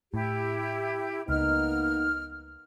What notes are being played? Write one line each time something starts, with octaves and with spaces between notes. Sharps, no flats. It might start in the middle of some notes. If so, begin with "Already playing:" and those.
A2 E4 G4
C#2 A#3 B3 D#4 F6